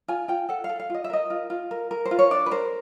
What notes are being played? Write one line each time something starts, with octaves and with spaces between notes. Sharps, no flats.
F4 G#5
F4 G5
A4 F#5
F5
A4
F5
F4 D#5
E5
A#4 D#5
F4
F4
A#4
A#4
C5
F4
C#5
D4 D5
B4
A#4 C5